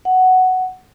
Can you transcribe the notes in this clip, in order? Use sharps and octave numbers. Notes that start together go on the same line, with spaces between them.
F#5